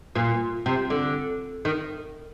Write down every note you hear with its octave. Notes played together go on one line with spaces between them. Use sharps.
A#2
C3
D3
D#3